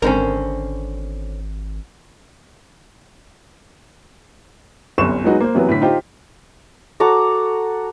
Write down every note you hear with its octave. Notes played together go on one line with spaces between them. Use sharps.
G#1 G#2 D3 C4 C#4 A#4 A#5
G1 C2 F#2 C#6 E7
F#3 G#3 B3 D#4 F#4
A#3 C5
C3 E3 F#3 B3
A2 D3 B6
D#4 F4 G4 C5
F#4 A4 A#5 D6